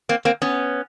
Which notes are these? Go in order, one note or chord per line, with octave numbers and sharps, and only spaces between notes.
A#3 C4
A#3 C4
B3 C#4